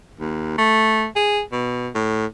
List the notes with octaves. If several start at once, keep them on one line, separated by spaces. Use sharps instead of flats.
D#2
A3
G#4
B2
A2